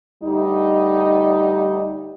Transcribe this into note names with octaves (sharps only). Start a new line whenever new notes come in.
D2 G3 D#4